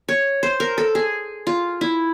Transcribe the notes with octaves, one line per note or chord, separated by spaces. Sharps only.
C#5
C5
A#4
A4
G#4
F4
E4